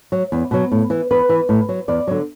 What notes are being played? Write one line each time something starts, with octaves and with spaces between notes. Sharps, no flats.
F#3
E2
B2 F#3
A2
E3
E2 B4
E3
A2
F#3
E2 D5
D3 F#3